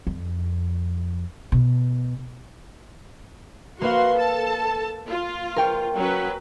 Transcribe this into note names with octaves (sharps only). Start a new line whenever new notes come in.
F2
B2
A#3 F#4 B4 F5 C6
A4 A5
F4
A#4 G5 C#6
F#3 C#4 B4